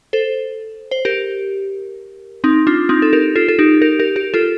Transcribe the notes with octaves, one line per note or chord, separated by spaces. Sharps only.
A4 C5
C5
G4 A#4
C4 D#4
D4 F4
C4 D#4
A4
G4 A#4
F4 A4
A4
D#4 G4
G4 A#4
G4 A#4
G4 A#4
F4 A4